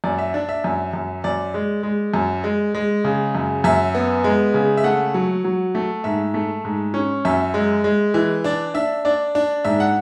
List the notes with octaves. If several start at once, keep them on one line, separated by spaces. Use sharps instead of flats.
F#2 D5
E5
D4 D5
E5
F#2
F#2
F#2 D5
G#3
G#3
F#2
G#3
G#3
C#3
F#2
F#2 E5
B3
G#3
C#3
E5
A3 F#5
F#3
F#3
A3
G#2 E5
A3
G#2
C#4
F#2 E5
G#3
G#3
E3
D4 D5
D4 E5
D4 D5
D4
G#2 E5
F#5